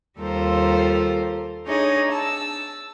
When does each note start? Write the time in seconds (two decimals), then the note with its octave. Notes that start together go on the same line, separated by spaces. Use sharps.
0.19 D#2 G3 F4 A4 A#4 C5
1.66 D4 D#4 G#4 C#5 D#5
2.11 A5 E6